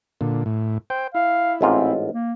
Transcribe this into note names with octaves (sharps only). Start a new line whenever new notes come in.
A#2 D3
A2
C5 G5
E4 F5
A1 G#2 C4 F4
A#3